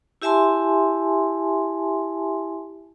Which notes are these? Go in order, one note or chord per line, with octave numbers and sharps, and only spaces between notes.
E4 G4 E5 G#5 A5 C6